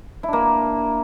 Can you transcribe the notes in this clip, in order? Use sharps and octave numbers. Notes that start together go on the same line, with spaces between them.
A#3 D4 E4